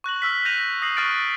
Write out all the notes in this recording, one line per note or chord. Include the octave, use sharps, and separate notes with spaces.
C#6 F#6 A#6 F#7
E6 F6 B6
G6 A#6 D#7 F7
D#6 A#6 C7 F#7
C#6 F6 F#6 A6 D7